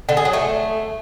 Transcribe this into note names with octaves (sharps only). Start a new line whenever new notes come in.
D3
G#4
F#3
A3